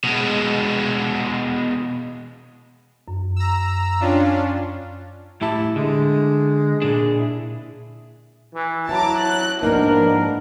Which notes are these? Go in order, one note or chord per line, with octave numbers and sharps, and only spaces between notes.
B2 G#3
F#2
A#5 E6
C#4 D4 F4 F5 G5
A2 E4 G4 A5
D3 G#3
A#2 D4 G#4
E4
E3
F#3 E4 A5 A#5 D6
F#6
G#2 B2 F3 A#3 D4 D#4 A#4